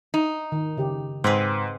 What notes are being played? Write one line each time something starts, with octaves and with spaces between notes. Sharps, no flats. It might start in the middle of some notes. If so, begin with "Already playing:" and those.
D#4
D#3
C#3 G4
G#2 C4 G#4 B4